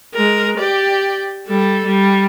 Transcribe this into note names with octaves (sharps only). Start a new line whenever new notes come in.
G#3 A#4
G4 D5
G3 A4
G3